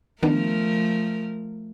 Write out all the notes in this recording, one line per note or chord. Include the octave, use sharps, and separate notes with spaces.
D#3 F3 A3 B3 D4 A#4